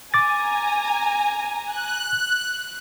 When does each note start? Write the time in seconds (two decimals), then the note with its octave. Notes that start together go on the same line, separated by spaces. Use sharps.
0.14 G#5 A#5 D6 A6
1.67 F#6